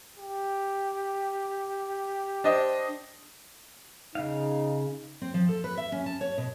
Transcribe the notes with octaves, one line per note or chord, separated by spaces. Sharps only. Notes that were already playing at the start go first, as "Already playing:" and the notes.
G4
D4 C5 D#5
C#3 D#4 F5
C4
F3
A4
B4
E5
C#4
A5
C#5
B2